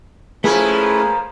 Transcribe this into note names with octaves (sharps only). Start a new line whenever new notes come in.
F3 A3 A#3 C#4 E4 G#4 B4 G#5